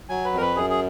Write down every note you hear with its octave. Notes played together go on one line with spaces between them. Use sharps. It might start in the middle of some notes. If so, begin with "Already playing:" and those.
F#3 G#5
B4
F2 A#4
B4
F#2 G#4
G#4